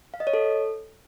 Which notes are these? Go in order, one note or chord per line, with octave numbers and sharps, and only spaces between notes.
F5
D#5
C#5
A4